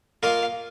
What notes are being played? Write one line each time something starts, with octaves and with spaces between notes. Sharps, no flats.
A#3 F4 A#4 D#5 F5